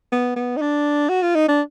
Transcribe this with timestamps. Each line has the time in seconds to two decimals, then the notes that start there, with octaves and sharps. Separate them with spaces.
0.12 B3
0.36 B3
0.57 D#4
0.62 D4
1.09 F#4
1.22 F4
1.35 D#4
1.48 D4